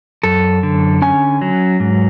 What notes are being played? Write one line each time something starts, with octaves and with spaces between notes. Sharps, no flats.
F#2 A4
D3
C#4 G#5
F#3
G#2